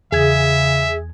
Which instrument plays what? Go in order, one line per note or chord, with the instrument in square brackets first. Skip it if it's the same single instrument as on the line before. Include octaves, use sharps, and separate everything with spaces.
[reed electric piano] E2 G#6 [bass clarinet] C#3 [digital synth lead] G#4 [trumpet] E5